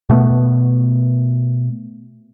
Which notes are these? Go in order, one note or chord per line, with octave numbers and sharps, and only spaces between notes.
B2 A3 B3